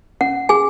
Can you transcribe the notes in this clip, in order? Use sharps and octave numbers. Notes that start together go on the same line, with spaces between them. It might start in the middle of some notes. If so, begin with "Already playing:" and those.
C#4 F#5
G#4 G#5